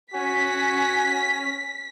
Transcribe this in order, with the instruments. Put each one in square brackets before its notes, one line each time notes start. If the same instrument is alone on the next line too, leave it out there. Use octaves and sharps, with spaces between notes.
[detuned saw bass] C#4 [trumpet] F#4 [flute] G#5 [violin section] B6